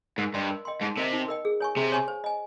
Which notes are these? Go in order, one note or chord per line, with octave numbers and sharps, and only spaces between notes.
G#2 A#4
G2 D#5 G5 C6
A#4
D#5 G5 C6
G#2 D#4
C3 A#4 D#5 G5
D#4
A#4 D#5 G5
G#4
C#5 G#5 C#6
C3 G#4
C#5 G#5 C#6
C5
D#5 G#5